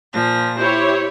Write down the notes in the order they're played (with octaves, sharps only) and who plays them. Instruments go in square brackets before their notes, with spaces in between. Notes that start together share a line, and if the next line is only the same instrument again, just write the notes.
[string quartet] A#2 F3 A#6
[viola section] E4 G4 C#5 [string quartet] C5